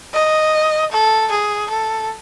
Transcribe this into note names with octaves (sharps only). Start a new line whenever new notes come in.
D#5
A4
G#4
A4